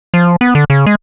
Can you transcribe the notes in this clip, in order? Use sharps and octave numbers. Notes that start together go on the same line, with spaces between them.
F3
B3
D3
C#3
G#3